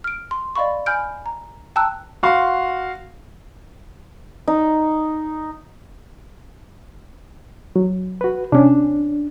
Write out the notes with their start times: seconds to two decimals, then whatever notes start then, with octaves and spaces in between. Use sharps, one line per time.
0.04 F6 D7
0.31 C6
0.56 D5 D#5 F5 B5 C#6
0.86 G#5 B5 F6 G6 D7
1.26 A#5
1.76 G5 A5 A#5 E6 F#6
2.23 F#4 F5 C6
4.47 D#4
7.76 F#3
8.21 F#4 B4
8.52 C3 C#4 D4